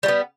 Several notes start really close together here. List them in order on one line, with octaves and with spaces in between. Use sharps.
G3 A3 B3